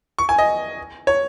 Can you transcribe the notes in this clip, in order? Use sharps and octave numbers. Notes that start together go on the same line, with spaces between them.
C#6
G#5
D#5
C#5